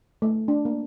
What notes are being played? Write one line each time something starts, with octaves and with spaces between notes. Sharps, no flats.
A3
D4
A#3